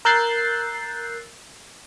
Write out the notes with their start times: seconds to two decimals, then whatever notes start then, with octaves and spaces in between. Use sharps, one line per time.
0.05 A#4 E6 F#6 G6 A6 C7